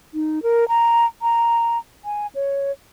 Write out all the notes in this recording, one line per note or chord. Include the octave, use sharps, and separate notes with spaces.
D#4
A#4
A#5
A#5
G#5
C#5